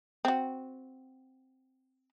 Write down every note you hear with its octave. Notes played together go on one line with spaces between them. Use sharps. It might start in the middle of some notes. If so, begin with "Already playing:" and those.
C4 F#4